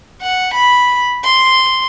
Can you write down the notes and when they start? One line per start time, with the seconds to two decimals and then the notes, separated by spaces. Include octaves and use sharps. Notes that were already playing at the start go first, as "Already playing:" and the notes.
0.22 F#5
0.54 B5
1.24 C6